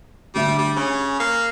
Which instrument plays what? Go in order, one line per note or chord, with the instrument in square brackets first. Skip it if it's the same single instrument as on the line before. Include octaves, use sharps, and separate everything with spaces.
[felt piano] D2 D4 E5 [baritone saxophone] G3
[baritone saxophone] G3
[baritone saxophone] C#3 [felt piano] G#5
[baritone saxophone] A#3